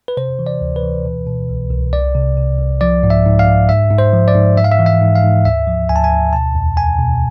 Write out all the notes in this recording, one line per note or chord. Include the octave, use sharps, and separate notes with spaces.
B4
C3 C5
E3
D5
D2
B4
E3
B2
B2
C2
C2
C2 D5
C3
C3
C2
F3 D5
G#2
E5
G#2
F5
G#2
G#2 E5
G#2
C5
F3
D5
G#2
G#2 E5
F5
E5
E3
E5
G#2
F5
G#2
D2 E5
F3
D2 G#5
A5
G#5
D2
B2 A5
E2
E2 G#5
B2